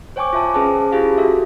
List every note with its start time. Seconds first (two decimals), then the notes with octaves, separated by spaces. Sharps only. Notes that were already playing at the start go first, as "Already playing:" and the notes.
0.16 C5 C#5 G5 G#5 C#6 D6
0.33 F4 E5 A5
0.54 C#4 G#4 B4 C5 A5
0.92 C#4 E4 F4 G4 G#4 F5
1.18 F#4 A4 E5